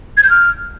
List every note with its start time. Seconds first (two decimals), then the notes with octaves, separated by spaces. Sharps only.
0.17 G#6
0.24 G6
0.30 F6